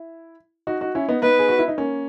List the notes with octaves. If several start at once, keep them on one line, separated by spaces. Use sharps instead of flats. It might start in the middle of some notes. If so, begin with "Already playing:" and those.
Already playing: E4
D#4 F#4
D#4 F#4
C#4 E4
B3 D#4
B3 D#4 B4
G#4
F#4
E4
D#4
A#3 C#4